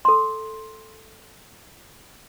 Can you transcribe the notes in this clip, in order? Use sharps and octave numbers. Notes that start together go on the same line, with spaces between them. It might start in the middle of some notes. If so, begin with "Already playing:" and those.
A4 C6